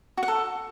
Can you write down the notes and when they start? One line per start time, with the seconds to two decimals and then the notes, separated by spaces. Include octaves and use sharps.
0.17 F#4
0.23 F#5
0.28 A4